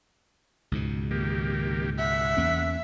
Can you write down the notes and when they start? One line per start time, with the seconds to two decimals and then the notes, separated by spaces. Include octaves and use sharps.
0.71 C#2 G#2 B2
1.11 D#3 A#3 G4
1.99 E5 F#5
2.37 E2 A#3 C#4